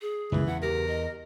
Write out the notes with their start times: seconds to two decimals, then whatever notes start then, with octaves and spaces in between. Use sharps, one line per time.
0.02 G#4
0.32 F#1 C#2 F#2 E3
0.47 E2 F#5
0.62 G4 A#4
0.88 D#5